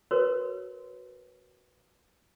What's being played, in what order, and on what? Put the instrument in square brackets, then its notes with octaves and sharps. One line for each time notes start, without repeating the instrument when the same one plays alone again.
[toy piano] F#4 A#4 B4 C#5